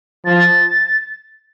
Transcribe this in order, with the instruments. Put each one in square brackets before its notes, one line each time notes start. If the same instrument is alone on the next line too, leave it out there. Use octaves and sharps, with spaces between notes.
[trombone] F3 [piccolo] A6